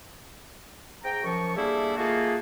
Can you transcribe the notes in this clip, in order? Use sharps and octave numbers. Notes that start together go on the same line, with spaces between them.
G#2 G5 A#5
F#2 F3 C#6
G3 A3 A#3 D4 E4 G#4
D#3 A3 A#3 F4 F#4 G#4